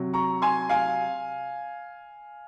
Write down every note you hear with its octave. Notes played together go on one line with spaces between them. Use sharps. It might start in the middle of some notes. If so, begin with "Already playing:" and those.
Already playing: C3 F#3
A#5 C#6
G#5 C6
F5 G#5